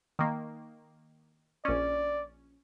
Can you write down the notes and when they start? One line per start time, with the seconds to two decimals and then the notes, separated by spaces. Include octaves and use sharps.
0.19 D#3 A#3
1.65 A#1 C#4 D5